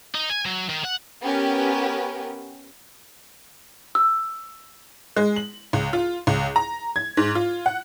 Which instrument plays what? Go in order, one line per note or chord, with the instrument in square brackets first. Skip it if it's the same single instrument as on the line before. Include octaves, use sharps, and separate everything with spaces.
[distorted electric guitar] D#4
G#5
F#3
D#3
F#5
[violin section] B3 C#4 G4 A#4 B4
[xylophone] E6
[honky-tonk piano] G#3
F#7
C#2
F4
C#2
A#5
G#6
G#2
F4
F#5